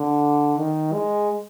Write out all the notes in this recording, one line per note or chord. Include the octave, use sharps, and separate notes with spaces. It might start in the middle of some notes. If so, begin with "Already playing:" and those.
Already playing: D3
D#3
G#3